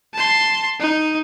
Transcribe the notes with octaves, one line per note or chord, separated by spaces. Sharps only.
A5 C6
D#4